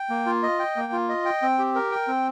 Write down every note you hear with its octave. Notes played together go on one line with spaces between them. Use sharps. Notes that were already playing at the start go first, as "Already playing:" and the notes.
Already playing: G5
A#3
F4
D#5
G5
A#3
F4
D#5
G5
C4
G4
A#4
G5
C4